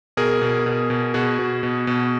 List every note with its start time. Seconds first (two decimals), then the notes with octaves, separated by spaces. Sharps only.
0.17 B2 G#4 A#4
0.42 B2
0.66 B2
0.90 B2
1.14 B2 F#4 G#4
1.39 B2
1.63 B2
1.87 B2